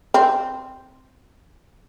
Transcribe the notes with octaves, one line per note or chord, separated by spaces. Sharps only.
C4